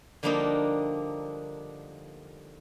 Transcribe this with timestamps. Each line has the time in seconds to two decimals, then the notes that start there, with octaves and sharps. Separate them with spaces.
0.23 D3 F3 G3 A#3 D4 D#4